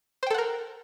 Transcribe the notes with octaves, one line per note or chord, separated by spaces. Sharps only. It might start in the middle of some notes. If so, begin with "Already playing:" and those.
A4 A#4 C5 F#5 G5